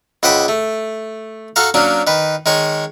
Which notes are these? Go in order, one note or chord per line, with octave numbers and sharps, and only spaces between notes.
C#2 C5 F#5 G5 B5 D#6
A3
F#4 A4 F5 A#5
F#3 A#3 C#4 D4
D#3 B4
D#3 G#3 C#5